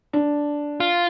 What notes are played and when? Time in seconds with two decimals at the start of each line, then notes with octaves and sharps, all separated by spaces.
0.13 D4
0.80 F4